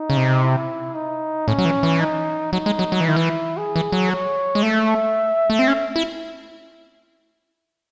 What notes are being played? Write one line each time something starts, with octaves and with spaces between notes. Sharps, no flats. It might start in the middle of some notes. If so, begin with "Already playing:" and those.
Already playing: D#4
C#3
C3
E4
D#4
A2 C#4
F#3
E3
E3
D#4
F#3 D#4
G#3
F#3
F#3
E3
D#3 E4
E3
G#4
E3
F#3
C#5
G#3
A3 E5
A3
C4
C#4
E4